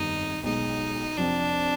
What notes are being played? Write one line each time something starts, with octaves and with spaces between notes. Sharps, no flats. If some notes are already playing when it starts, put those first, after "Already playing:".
Already playing: G1 F2 D#3 G3 D#4
B1 B2 G#3 D#4
F2 C3 F3 C4 D4